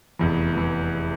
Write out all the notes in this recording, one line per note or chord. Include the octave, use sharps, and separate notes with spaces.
F1 E2 E3
E3